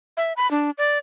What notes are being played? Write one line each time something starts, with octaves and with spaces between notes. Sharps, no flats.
E5
B5
D4
D5